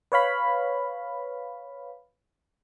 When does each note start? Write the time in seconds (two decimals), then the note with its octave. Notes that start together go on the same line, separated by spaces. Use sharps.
0.12 B4 C#5 F5 B5